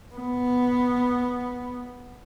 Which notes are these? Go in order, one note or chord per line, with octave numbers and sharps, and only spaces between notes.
B3